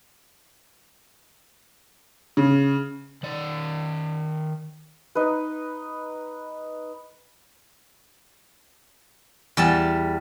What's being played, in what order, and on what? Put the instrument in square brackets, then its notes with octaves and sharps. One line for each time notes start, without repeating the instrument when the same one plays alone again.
[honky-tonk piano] C#3
[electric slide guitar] D#3 D5
[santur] D#4 B4
[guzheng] E2 G3 A5